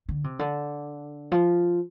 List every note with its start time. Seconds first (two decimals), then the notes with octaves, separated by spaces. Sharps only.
0.09 D3
0.24 C3
0.39 D3
1.32 F3